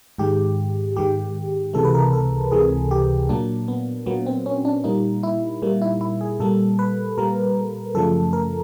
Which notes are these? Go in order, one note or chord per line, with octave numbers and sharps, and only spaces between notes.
G#2 D#3 G#3 G4
G#2 D#3 G#3 G4
C#2 C3 E3 G#3 A4
B4
A#4
A4
C#2 C3 E3 G#3 G#4
G4
A#2 F#3 A#3 D4
B3
A#2 F#3 A#3 B3
C4
C#4
D4
A#2 G3 A#3 D#4
E4
A#2 G3 A#3
E4
E4
G#4
A#2 G3 A#3 A4
B4
A#2 G3 A#3 A#4
F#2 C#3 F3 A3 A4
A#4